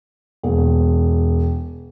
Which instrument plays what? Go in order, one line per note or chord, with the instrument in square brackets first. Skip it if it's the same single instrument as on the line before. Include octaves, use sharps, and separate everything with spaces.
[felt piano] E1